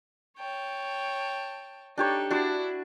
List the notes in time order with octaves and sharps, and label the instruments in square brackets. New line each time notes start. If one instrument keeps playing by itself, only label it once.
[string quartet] C#5 G5 A5
[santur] D4 G4 C#5 [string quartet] D#4 A4
[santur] D4 F#4 [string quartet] E4